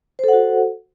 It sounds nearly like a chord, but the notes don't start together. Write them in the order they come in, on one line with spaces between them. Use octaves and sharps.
C5 A4 F#5 F#4